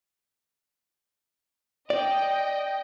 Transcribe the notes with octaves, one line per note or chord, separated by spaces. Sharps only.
D5 D#5 G5